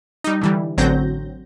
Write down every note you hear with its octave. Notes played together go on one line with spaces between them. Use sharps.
G3 D#4
D3 E3 G3
A1 D3 F#3 C4 G6 A#6